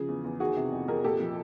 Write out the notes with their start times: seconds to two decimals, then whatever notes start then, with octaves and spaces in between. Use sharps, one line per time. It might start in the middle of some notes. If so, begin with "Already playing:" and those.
Already playing: C#3 F3 G#4
0.08 E2
0.24 E2
0.40 D#3 F#4 G#4
0.57 C3
0.72 F2
0.88 F2 G#4 A#4
1.04 A#2 G4 A4
1.20 F3